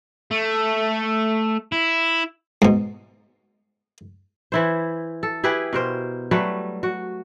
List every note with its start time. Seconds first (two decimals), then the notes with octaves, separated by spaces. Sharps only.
0.31 A3
1.72 E4
2.62 G#2 B2
4.52 E3 E4 C5
5.23 A4
5.44 E4 G4 G#4 B4
5.73 B2 A#4 C5
6.31 F#3 G3 A3 B4
6.83 F#4